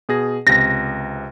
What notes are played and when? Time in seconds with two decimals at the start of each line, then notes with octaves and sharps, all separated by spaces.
0.09 B2 G#4 A#6
0.47 C#2 C3 A#6